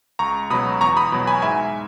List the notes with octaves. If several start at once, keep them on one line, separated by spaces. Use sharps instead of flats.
C#2 A#5 C#6
B2 F#3 B5 D#6
E2 A#5 C#6
B5 D#6
B2 F#3
G#5 B5
G#2 E5 G#5